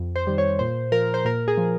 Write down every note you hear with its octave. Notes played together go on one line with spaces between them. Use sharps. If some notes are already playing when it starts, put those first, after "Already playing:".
Already playing: F2
C5
D#3 G3
C#5
A#2 C5
F3 A#4
C5
A#2 A#4
G#4
F3